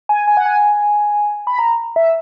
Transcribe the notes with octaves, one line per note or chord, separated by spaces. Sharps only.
G#5
G#5
F#5
G#5
B5
A#5
E5